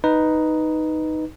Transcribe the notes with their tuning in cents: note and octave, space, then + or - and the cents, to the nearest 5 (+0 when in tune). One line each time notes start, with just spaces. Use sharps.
D#4 +0 B4 +0